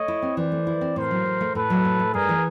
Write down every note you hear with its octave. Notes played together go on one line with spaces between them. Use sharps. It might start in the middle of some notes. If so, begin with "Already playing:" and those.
Already playing: A3 C#5 D#5
E4
C4
E3 C5 D5
A3
E4
C4
A2 A#4 C5
F#3
A2
A3
A2 A4 B4
F#3
A2
A3
G2 G#4 A#4
E3